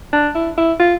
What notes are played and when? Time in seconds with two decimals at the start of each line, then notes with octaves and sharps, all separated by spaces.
0.13 D4
0.35 E4
0.57 E4
0.79 F4